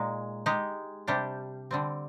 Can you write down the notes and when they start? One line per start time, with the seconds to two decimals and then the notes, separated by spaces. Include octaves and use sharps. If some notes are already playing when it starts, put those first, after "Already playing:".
Already playing: A#2 G#3 D#4
0.46 G#3 D#4 G4
1.07 C3 G3 D4 G4
1.71 D3 G3 C4